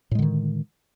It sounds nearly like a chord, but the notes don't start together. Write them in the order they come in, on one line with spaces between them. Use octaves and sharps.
A2 G#3 D3 D#3